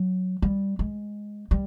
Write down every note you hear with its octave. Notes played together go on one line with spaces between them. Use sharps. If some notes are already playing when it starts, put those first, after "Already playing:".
Already playing: F#3
G3
G#3
G3